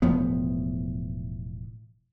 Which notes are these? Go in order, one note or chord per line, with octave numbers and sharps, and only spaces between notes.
E1 A2 F3 B3